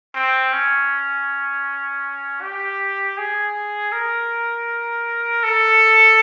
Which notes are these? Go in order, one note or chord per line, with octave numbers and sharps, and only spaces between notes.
C4
C#4
G4
G#4
A#4
A4